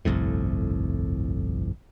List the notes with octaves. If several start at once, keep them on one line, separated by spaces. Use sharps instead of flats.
G1 C2 F2 A2